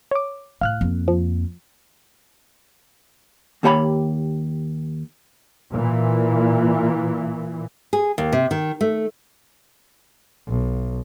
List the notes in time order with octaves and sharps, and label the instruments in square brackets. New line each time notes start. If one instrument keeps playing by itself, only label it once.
[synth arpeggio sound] C#5 D6
[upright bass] A2 [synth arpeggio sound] F5 F6 F#6
[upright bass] F2 A#3
[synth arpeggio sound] F3
[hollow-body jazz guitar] D#2 A#3 G4 C#5 G#5 B5
[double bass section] A#2 E3
[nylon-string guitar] G#4
D#2
C3
D#3
A3
[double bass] B1